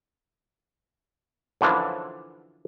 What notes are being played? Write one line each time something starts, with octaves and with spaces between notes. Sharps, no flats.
F#2 D3 E3 F3 D4